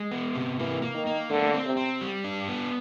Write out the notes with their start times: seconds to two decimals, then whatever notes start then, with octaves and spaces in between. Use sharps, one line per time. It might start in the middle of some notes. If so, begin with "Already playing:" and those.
Already playing: G#3
0.11 B3
0.35 C3
0.59 E3 A#3
0.82 A#3
0.94 D#3
1.07 A#3
1.29 D3 A3
1.54 C4
1.65 C3
1.77 C4
2.01 G3
2.24 D4
2.48 B3